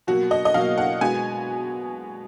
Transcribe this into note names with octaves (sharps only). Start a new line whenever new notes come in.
B2 F#3 A#3 F#4
D#5
D#5
B2 F#3 A#3 F5
F#5
B2 G#3 B3 G#5